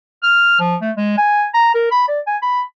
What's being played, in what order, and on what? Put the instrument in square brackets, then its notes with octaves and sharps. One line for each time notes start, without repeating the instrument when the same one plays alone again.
[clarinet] F6
F3
A3
G#3
G#5
A#5
A#4
B5
D5
G#5
B5